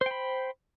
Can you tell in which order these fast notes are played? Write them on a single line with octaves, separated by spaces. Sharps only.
C5 G5 B5